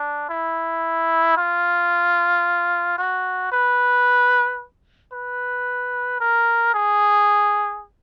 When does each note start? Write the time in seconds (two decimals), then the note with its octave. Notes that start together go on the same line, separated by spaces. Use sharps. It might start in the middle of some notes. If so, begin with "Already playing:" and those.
Already playing: D4
0.29 E4
1.37 F4
2.98 F#4
3.52 B4
5.13 B4
6.20 A#4
6.74 G#4